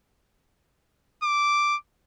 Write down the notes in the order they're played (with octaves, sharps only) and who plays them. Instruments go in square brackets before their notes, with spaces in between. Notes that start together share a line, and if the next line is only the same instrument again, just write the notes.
[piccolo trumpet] D6